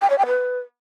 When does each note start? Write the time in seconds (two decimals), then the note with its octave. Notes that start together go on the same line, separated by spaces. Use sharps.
0.02 G5
0.10 C#5
0.18 G5
0.26 B4